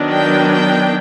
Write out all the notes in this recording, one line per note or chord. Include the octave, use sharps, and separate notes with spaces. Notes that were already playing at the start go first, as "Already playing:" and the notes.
Already playing: D#3 F#3 B3 D4
G5
G5